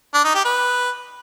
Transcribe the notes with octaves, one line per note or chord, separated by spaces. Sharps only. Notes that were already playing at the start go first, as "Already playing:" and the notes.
D4
D#4
G4
B4